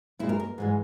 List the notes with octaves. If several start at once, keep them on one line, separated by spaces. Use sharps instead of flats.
A#2 G#3 E4
A#4
A#4
G#2 E3 G#3